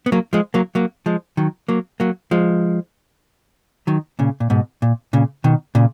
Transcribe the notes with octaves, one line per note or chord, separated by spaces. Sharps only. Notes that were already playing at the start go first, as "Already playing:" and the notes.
B3
F#3 A#3
F3 G#3
F#3 A#3
F#3 A#3
F3 G#3
D#3 F#3
F#3 A#3
F#3 A#3
F3 G#3
D#3 F#3
A#2 C#3
A#2
G#2 B2
A#2
A#2 C#3
B2 D#3
A#2 C#3